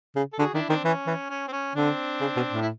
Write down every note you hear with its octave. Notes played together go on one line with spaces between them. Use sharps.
C#3
A4
D3 F#4 G#4
D#3 D4 E4
D#3 C4 D4
E3 C#4
E3
C#4
C4
C#4
D3 C4 D4
C#3
B2
A2
E4